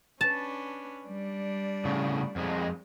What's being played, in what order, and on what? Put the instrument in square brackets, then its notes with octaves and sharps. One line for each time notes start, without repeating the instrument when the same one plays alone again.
[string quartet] C#4 D4 B4 [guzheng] A5
[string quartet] G3 D4
[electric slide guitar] A2 C#3
F2 G#3